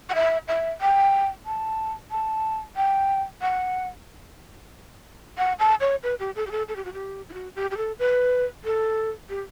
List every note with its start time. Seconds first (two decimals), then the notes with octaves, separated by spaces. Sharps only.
0.10 F#5
0.15 E5
0.48 E5
0.81 G5
1.46 A5
2.11 A5
2.76 G5
3.42 F#5
5.38 F#5
5.59 A5
5.81 C#5
6.03 B4
6.19 G4
6.36 A4
6.47 G4
6.51 A4
6.68 A4
6.76 G4
6.85 F#4
6.93 G4
7.29 E4
7.34 F#4
7.56 G4
7.71 G4
7.77 A4
7.99 B4
8.64 A4
9.29 G4